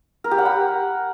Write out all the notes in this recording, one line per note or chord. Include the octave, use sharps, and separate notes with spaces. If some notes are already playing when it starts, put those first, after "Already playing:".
A#4
G4
F#5
B5
A#4